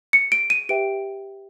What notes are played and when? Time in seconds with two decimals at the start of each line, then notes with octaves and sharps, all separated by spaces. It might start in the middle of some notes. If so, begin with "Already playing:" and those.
0.13 C#7
0.32 D7
0.50 D#7
0.69 G4 B4 E5 G5 D7